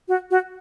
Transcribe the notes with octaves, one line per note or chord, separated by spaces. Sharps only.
F#4
F#4